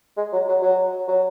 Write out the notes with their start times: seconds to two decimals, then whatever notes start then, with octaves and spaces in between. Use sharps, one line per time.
0.17 G#3
0.33 F#3
0.48 F#3
0.63 F#3
1.08 F#3